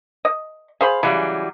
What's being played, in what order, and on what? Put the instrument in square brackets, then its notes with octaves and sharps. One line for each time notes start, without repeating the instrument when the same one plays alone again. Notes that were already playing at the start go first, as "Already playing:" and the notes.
[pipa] D#5
[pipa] G#4 C5 B5 [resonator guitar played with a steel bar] F5
[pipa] C#3 [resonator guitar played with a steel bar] E3 F#3 G3